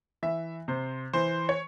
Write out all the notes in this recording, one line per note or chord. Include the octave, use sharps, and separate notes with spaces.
E3 E5
C3 C5
E3 C5
C#5